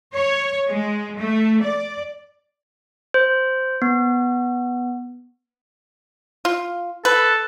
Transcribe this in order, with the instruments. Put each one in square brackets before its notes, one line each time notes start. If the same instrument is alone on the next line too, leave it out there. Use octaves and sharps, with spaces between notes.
[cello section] C#5
G#3
A3
D5
[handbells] C5
B3
[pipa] F4
[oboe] A4 [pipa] B4